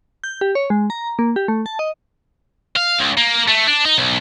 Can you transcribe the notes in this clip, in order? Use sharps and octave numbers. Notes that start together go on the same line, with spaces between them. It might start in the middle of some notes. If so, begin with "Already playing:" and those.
G6
G4
C#5
G#3
A#5
A#3
G4
A3
A5
D#5
F5
C#2
A#3
A3
D4
D#4
B1